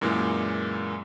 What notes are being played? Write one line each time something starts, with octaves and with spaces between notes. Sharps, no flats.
F#2 A#2 E3 G#3 A#3